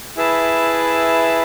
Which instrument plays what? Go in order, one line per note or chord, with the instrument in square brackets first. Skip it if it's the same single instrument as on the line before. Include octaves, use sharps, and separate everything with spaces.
[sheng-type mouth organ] E4 G#4 B4 E5 A5